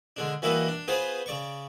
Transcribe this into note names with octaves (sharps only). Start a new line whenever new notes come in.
D3 G#3 D4
E3 G3 A#3 E4 F#4 D#5
D4
B3 F4 G#4 C5 C#5
C#3 D5 C#6